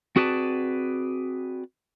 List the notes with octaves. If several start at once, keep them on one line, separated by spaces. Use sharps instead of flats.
C4 F#4 G#4 B4 D5 A5